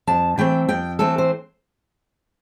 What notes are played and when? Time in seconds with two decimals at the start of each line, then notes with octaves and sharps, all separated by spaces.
0.07 F2 A5
0.38 E3 A3 C4 G5
0.69 F2 G5
0.99 E3 A3 C4 A4
1.18 C5